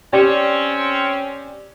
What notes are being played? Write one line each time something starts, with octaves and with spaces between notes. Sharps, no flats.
C4 C#4 G4 D5